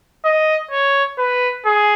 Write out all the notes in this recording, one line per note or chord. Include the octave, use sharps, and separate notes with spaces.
D#5
C#5
B4
G#4